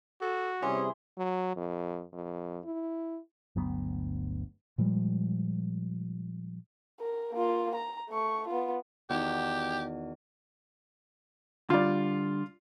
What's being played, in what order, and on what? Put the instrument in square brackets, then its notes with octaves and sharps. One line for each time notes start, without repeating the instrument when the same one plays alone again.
[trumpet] F#4 [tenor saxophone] A4
[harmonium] C3 G3 G#4 [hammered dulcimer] E3 C6 [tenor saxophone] C#4
[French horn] F#3
F2
F2
E4
[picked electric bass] G1 D2 F#3 B3
[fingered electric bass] A#2 F3 G3 G#3
[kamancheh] A#4
A#3 F4
A#5
A3 C#6
B3 F4
[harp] E2 D#3 F#4 [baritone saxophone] G4
[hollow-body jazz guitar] D3 G3 [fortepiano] F4 D5